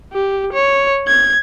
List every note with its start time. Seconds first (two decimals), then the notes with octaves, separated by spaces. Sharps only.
0.13 G4
0.53 C#5
1.07 G#6